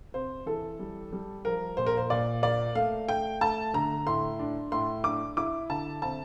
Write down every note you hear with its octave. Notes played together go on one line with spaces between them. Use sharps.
C3 C5
E3 A4
G3
G3
F3 A#4
A#2 C5
A#4
C5
A#2 D5
A#3 D5
A3 F5
A3 G5
A3 A5
D3 A#5
A2 C6
D4
A2 C6
D4 D6
E4 D6
D3 A5
C4 A5